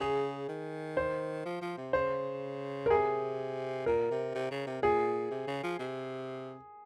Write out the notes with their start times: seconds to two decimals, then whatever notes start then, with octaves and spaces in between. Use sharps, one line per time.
0.01 C#3 G#4
0.49 D#3
0.97 C5
1.45 F3
1.62 F3
1.78 C3
1.93 C#3 C5
2.86 A#4
2.90 C3 G#4
3.86 A#2 A#4
4.11 C3
4.35 C3
4.51 C#3
4.67 C3
4.82 A#2 G#4
5.31 C3
5.48 C#3
5.64 F3
5.79 C3